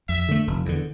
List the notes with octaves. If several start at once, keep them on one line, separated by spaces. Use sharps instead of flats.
F2 E5
D3 A3
F1
E2 D3